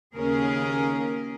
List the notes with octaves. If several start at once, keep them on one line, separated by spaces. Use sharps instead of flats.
D#2 C#3 A#3 C#4 G#4 A#4